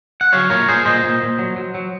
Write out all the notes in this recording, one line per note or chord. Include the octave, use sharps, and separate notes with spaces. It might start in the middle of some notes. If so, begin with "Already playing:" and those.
F#5
F#3 C#5 F5
A#2 A#4 C#5
A#2 G#4 C5
A#2 C5 D#5
A#2
A#2
F#3
F#3
F#3